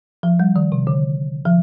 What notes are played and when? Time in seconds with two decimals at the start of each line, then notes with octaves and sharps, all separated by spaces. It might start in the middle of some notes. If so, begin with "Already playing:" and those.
0.23 F3
0.40 G3
0.56 D#3
0.72 C3
0.87 D3
1.45 F3